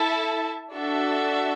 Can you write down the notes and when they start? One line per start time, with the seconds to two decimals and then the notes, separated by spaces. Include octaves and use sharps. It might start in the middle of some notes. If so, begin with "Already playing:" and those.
Already playing: E4 A4 E5 A5
0.73 D4 F#4 A4 E5